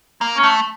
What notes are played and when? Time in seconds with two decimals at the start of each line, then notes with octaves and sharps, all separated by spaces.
0.21 A#3
0.37 C#4
0.43 A3